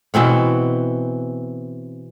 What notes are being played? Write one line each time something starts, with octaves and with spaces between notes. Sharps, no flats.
B2 E3 C4 F#5